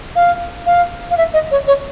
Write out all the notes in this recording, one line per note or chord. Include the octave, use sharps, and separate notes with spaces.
F5
F5
F5
E5
D#5
C#5
C#5